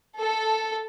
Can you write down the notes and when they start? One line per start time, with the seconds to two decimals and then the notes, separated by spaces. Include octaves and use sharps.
0.20 A4